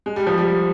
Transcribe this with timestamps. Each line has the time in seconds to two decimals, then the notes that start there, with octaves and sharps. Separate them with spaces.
0.06 G#3
0.16 G3
0.27 F3
0.38 G3